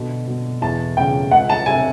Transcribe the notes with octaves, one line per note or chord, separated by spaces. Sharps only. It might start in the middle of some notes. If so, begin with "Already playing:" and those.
Already playing: B2 D3
B2
E2 A5
C#3 G5
C#2 F#5
A5
C3 G#5